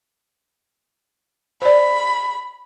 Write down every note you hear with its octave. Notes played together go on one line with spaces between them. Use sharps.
C5 D5 B5